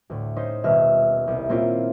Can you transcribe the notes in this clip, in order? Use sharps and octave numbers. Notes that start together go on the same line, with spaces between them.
D2 A2
C#4 D#4 C5
D#1 B2 E5 F6
C2
A#2 A#3 C4 C#4 E4 F4